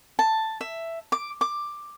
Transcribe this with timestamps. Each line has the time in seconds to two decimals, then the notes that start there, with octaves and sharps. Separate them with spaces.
0.19 A5
0.61 E5
1.12 D6
1.41 D6